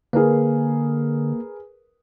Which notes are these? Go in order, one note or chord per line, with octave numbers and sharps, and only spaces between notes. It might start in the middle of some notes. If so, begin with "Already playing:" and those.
D3 A#3 G#4 A#4 B4